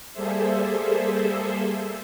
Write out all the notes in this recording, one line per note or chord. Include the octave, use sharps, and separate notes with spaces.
G3 A#3 G#4 A4 C5 E5